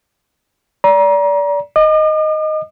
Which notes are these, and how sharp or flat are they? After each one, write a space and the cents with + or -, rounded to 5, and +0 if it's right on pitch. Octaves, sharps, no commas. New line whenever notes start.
D5 -25 A#5 +30
D#5 +0 D6 +45